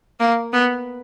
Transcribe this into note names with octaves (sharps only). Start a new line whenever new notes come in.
A#3
B3